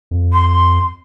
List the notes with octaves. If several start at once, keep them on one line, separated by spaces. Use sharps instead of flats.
F2
C6